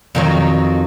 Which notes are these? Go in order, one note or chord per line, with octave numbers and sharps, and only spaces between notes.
F2 D#3 F#3